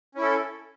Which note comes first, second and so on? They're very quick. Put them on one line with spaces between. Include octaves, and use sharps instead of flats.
C#4 E4 A4